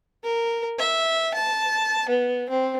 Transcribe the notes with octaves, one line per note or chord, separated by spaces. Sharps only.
A#4
E5
A5
B3
C4